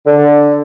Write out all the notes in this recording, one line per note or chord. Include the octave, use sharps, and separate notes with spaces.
D3